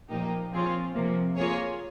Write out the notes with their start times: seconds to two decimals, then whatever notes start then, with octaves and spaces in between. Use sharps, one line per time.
0.09 A#2 F3 A#3 D#4 G4
0.52 F3 C4 F4 G#4 C#5
0.95 C3 F3 A#3
1.37 A#3 F4 G#4 C#5